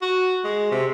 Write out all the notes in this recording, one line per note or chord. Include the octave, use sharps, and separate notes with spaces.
F#4
G#3
C3